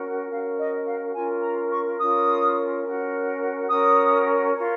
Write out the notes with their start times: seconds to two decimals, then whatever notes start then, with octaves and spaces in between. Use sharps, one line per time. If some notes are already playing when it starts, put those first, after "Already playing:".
Already playing: C#4 F#4 A#4
0.30 C#4 F#4 A#4 F5
0.58 D#5
0.86 F5
1.14 C#4 F4 A#4 G#5
1.42 A#5
1.71 C#6
1.99 C#4 F4 A#4 D#6
2.84 C#4 F#4 A#4
3.69 C#4 F#4 A#4 D#6
4.53 F4 A#4 C#5